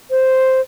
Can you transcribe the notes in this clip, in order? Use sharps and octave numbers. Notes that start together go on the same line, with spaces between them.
C5